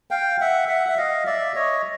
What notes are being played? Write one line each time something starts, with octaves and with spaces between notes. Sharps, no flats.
F5 G5
E5 F#5
E5 F#5
E5
D#5 F5
D5 E5
C#5 D#5